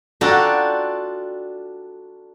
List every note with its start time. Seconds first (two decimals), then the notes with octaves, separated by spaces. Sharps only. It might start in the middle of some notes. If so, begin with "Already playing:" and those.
0.21 D4 F4 F#4 A4 G5 A#5